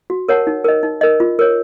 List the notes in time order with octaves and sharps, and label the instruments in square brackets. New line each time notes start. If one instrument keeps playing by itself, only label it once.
[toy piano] F#4
A#4 C#5 F#5 A5
D#4
A#4 D#5
D#4
A#4 D#5
F4
A#4 C#5